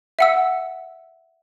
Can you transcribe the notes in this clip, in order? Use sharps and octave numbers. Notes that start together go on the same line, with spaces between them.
E5 F#5 E6